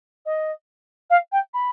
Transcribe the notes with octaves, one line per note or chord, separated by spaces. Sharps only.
D#5
F5
G5
B5